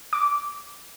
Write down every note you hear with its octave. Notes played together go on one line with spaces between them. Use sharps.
D6